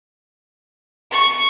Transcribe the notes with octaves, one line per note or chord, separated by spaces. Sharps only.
C#6